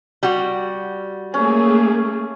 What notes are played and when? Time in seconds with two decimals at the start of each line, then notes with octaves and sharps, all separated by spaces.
0.23 G3 F#4
1.34 A3 A#3 C#4 G#4